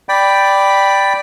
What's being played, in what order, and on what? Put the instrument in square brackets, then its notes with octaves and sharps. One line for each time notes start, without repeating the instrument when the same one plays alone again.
[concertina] D5 G5 B5